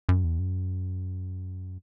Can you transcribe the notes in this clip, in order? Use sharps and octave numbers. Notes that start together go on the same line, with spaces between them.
F#2
E2
F#2